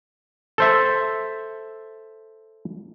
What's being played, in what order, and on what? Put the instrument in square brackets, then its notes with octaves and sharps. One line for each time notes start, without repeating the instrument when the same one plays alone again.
[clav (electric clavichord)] A4 C5 E5